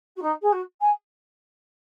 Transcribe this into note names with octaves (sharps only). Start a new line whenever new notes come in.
F#4
D#4
G#4
F#4
G#5